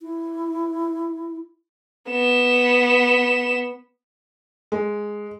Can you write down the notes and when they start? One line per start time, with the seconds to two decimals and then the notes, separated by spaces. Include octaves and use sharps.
0.02 E4
2.10 B3 E7
4.72 G#3